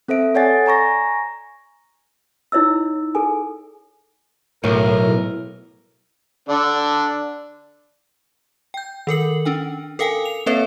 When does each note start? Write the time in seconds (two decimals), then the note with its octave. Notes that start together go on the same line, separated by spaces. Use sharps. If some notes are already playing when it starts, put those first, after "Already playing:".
0.08 C4 A4 C5 E5 D7
0.35 A4 C#5 D5 F#5 G#5 A6
0.66 G#5 A#5 C#6 A#6
2.52 D#4 E4 C#5 D#5 E6
3.15 G#4 A4 G#5
4.64 B1 A2 A#4
6.49 D3 D4
8.74 G5 G6
9.07 D#3 A4 A#4 F#7
9.45 C#4 D4 G5
9.99 A4 A#4 F5 G5 G#5
10.25 F7
10.46 A#3 C4 A4 B4 C#5 E5